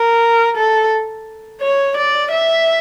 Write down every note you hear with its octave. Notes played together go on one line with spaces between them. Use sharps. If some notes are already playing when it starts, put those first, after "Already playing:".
Already playing: A#4
A4
C#5
D5
E5